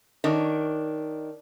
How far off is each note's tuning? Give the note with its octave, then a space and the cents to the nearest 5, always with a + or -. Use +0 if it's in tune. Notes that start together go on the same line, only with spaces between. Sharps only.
D#3 +0 D4 +0 C#5 +0